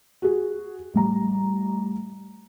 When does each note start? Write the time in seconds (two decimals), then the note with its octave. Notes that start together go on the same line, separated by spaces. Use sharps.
0.22 F#4 G#4
0.94 A1 G3 A#5